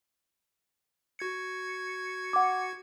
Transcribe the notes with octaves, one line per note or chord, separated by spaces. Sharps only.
F#4 G#6 C#7
F#5 D6